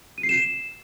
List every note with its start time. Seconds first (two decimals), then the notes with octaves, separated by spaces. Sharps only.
0.18 D#7
0.23 C7
0.29 E7